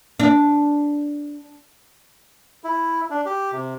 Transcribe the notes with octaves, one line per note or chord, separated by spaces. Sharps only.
D4
E4
D4
G4
C3